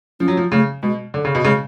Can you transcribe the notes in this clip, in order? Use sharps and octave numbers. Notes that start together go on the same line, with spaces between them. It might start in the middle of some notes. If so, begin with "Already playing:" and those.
F3 C#4
F#3
F3
C#3 A3
B2 G#3
D3
C#3
B2
C#3 G#3